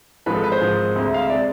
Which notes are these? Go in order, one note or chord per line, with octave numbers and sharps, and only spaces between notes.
G#1 G#2 F3 G#3 B4
A4
B4
C5
G#1 G#2 F3 G#3
D2 C3 G#3
F5
E5
C3 G#3 D5